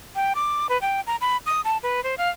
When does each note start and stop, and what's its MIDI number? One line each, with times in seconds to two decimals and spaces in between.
0.16 0.33 79
0.35 0.67 86
0.69 0.80 71
0.81 1.01 79
1.07 1.16 82
1.21 1.37 83
1.46 1.61 87
1.65 1.77 81
1.83 2.03 71
2.03 2.15 72
2.18 2.29 77